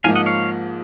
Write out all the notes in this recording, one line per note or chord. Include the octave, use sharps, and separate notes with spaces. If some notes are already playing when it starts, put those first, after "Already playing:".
G#2 F3 A#3 D#4 F5 G#5
D#5 F#5
C#5 F5